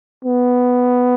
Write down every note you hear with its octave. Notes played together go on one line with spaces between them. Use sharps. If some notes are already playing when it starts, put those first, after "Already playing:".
B3